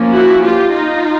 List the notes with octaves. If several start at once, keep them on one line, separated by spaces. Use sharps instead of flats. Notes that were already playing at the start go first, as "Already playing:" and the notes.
Already playing: F3 A#3 C#4
E4 F#4
F4 G4
D#4 F4